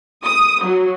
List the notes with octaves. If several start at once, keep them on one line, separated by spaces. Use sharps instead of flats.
D#6
F#3